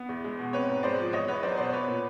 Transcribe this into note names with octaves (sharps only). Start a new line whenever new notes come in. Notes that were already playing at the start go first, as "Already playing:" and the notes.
Already playing: B3
E2
G#3
B2
C4 B4 C#5
G#2
G#3 C5 D5
F3
E2 C#5 D#5
E2 B4 C#5
F#3 C5 D5
B2 C5 D5
B3 B4 C#5
A#2